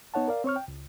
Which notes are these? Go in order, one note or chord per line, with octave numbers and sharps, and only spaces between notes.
B3 D#4 C#5 F#5 A5
A#4 D5 F5
C4 C#5 C#6 F6
G5
C#2